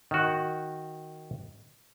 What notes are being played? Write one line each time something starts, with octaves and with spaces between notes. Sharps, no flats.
D#3 F#4